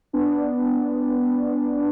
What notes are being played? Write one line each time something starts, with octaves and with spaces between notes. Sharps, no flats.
B3 D4